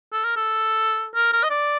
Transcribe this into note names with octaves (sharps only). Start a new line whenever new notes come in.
A4
A#4
A4
A#4
A#4
D#5
D5